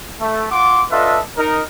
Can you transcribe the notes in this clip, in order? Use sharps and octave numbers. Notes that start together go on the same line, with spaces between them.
A3
F4 F#5 C6 D6
D4 F4 A4 B4 D#5 E5
D#4 A#4